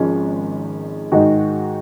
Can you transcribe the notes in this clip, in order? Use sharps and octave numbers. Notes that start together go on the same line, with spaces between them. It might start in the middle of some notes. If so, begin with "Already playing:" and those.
Already playing: G#1 G#2 F3 G#3 C#4
G#2 D#3 G#3 D#4 F#4